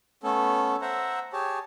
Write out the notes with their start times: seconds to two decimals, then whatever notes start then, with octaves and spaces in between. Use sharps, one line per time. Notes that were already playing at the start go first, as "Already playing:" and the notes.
0.23 A3 B3 C#4 A4
0.82 C5 E5 F#5 A#5
1.33 G4 G#4 C#5 A5